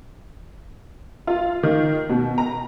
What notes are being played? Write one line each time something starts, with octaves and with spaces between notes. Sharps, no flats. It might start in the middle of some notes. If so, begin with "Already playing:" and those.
F4
D#3
B2
A#5